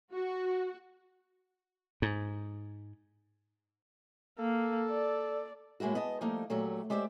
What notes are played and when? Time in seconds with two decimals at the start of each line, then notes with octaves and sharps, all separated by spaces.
0.12 F#4
2.02 G#2
4.39 A#3 A4
4.90 D5
5.80 A2 G#3 A#3 E4 F#4
5.95 B3 D#5 A5
6.21 F3 G3 A3 A#3 D#4
6.50 A#2 F#3 A3 F#4 G4
6.90 G#3 G4 C5 D5 E5